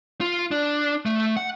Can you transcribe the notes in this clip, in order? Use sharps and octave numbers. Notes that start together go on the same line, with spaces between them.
F4
D4
A3
F#5